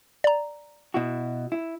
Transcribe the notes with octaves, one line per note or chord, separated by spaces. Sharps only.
D5 A#5
B2 E4 F#4
E4